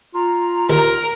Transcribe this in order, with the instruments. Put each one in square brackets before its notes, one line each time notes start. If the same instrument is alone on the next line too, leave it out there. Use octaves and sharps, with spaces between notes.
[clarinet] F4 [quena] A#5
[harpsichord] D#2 [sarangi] A#4